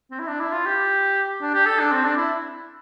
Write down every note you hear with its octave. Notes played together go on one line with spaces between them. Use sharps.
C4
E4
D4
E4
F4
G4
D4
G4
A4
D4
C4
D4
E4